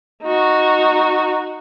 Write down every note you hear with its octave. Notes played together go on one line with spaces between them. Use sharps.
D#4 F#4